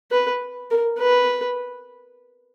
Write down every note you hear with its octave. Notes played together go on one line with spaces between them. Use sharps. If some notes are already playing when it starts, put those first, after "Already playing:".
B4
A#4
B4